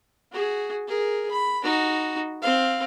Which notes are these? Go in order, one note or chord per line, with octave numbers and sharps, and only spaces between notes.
F#4 G#4
G#4 A#4
B5
D#4 F#4
C4 F5